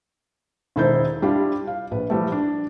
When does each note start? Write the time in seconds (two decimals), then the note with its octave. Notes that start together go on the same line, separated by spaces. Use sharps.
0.76 E1 D#3 E4 A4 C5 G6
1.22 G3 D4 E4 F4 G4
1.67 F5
1.91 A#1 B4
2.10 E3 F3 G3 A3
2.32 D4